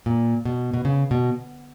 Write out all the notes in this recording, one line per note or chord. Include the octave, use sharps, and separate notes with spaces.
A#2
B2
B2
C#3
B2